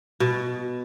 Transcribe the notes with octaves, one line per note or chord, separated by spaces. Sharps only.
B2